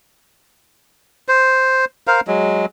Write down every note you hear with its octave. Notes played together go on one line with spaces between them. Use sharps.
C5
A#4 C5 F5
F#3 G#3